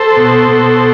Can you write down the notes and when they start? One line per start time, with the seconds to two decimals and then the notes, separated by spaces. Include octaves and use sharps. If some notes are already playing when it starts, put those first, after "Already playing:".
Already playing: A4 C5
0.16 B2
0.48 B2